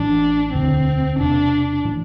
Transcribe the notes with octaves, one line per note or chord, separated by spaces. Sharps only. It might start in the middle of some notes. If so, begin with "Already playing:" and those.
Already playing: A1 A2 E3 D4
E1 D2 D3 C4
E1 E2 C3 D4
A2 E3